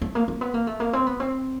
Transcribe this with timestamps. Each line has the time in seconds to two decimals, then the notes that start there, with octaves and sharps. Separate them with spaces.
0.01 A3
0.15 A#3
0.28 A#3
0.41 B3
0.54 A#3
0.67 A3
0.80 A#3
0.93 C4
1.06 B3
1.20 C4